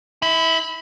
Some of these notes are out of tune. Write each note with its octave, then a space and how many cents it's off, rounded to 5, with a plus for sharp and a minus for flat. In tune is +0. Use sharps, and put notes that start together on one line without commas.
E4 -25 B5 +20